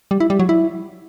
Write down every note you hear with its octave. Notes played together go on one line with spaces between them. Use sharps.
G3
E4
G3
F#3
E4